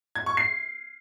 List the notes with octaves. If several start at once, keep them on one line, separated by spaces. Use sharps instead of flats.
G#6
C#6
C7